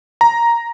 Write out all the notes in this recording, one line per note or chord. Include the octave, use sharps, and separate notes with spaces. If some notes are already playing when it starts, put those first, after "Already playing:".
A#5